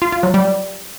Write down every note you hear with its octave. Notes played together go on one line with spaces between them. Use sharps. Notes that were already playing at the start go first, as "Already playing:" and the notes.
F4
F4
F#3
G3